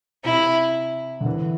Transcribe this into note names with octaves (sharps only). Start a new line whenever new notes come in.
C3 E4
D3
E3